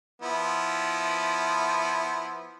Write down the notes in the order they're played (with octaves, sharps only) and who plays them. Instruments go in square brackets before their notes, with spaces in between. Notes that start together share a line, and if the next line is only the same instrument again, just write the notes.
[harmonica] F3 B3 E4